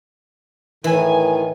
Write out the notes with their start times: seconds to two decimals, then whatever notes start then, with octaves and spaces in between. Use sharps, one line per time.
0.84 A2 D#3 E3 G#5